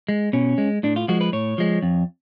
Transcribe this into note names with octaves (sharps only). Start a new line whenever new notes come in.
G#3
B2 C#4
G#3
A2 D4
F4
F3 G#3 F#4
B4
A2 C#5
F3 G#3
F2